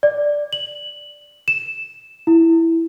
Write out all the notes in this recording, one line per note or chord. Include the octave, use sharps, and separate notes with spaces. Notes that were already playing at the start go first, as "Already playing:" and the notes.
D5
F#7
E7
E4